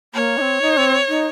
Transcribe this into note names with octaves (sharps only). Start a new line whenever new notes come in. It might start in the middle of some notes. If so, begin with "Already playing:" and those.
A#3 C#5
D#4
C4
D#4
C4
D#4